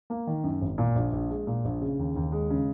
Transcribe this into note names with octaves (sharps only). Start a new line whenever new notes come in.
A#3
D#3
F#2
G#1
A#2
A#1
A#1
G#3
A#2
A#1
C#3
D#2
D#2
G#3
C#3